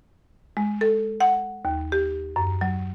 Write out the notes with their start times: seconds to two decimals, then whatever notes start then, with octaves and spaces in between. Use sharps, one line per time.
0.57 G#3
0.81 A4
1.21 F#5
1.65 D#2
1.92 G4
2.36 F#2
2.61 F#3